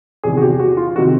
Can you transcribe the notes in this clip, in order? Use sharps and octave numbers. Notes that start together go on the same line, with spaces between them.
E2 C3 D#3 G#4
F#4
G4
F#4
F4
C3 D#3 F#4